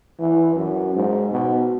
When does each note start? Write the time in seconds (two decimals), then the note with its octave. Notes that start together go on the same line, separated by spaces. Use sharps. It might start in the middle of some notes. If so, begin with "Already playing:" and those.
0.19 E3
0.56 F#2
0.95 G#2
1.31 B2